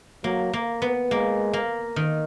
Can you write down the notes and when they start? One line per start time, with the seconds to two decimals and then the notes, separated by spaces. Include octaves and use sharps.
0.24 F#3 A#3
0.53 A#3
0.82 B3
1.11 G#3 A#3
1.53 A#3
1.96 D#3